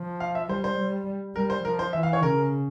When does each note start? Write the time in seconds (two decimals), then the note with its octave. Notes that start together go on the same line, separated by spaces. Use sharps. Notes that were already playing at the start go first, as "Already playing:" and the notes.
Already playing: F3
0.20 F5
0.35 E5
0.49 G3 C5
0.64 C5
0.78 G3
1.35 G3 A#4
1.50 C5
1.64 F3 A#4
1.79 C5
1.93 E3 E5
2.03 F5
2.13 C#5
2.23 C#3 A#4